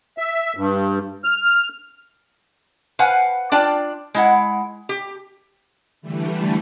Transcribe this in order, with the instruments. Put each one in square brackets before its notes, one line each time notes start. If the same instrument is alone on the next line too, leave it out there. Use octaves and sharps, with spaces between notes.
[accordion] E5
G2
F6
[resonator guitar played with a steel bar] B4 C5 F5 F#5 G#5
D4 F4 D5 G5
G#3 E4 F#5
G4
[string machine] D3 E3 G3 A3